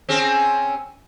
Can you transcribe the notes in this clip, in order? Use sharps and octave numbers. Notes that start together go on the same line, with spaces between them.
C4 C#4 G#4